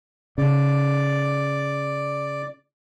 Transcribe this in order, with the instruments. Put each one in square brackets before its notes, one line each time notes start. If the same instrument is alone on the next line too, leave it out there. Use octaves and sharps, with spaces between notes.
[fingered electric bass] C#3 [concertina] D5